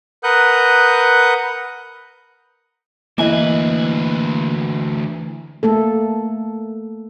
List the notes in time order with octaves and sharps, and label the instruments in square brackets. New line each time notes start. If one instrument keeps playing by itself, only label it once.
[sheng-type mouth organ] A#4 B4 F#5 D#6 F#6 G6
[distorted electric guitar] D2 B4 [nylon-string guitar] E3 D#5 [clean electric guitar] A#3 G#5
[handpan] A3 A#3 A4